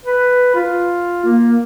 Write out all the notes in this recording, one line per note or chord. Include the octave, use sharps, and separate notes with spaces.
B4
F4
A#3